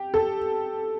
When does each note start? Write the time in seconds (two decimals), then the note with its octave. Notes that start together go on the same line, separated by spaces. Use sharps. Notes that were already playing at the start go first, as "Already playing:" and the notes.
Already playing: G4
0.14 A4